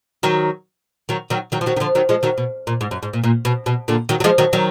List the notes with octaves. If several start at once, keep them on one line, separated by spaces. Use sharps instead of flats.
D#3 F#3
D#3 F#3
D#3 F#3
D#3 F#3
F3
D#3 F#3
D#3
D3 F3
D#3 F#3
F3 G#3
D#3 F#3
B2
A#2
G#2
F#2
G#2
A#2
A#2
B2
B2
A#2 D3
D#3 F#3
F#3
F3 G#3
D#3 F#3
D#3 F#3